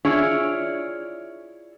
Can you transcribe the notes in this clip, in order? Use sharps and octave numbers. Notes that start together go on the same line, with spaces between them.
E4 F4 G#4 C#5 D5